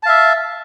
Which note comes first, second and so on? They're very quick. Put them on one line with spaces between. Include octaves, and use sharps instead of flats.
A5 F5 E5